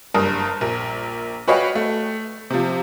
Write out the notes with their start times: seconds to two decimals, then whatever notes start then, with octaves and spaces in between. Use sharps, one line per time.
0.14 F#1 G2 A#4 D#6
0.61 A#1 A#4
1.48 F#4 B4 C#5 D#5 F5 G5
1.75 A3
2.50 C3 F3